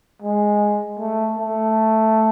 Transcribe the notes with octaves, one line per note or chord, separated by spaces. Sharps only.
G#3
A3
A3